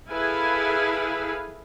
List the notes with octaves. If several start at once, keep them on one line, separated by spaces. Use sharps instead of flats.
E4 G#4 A4 B4 F5 G#5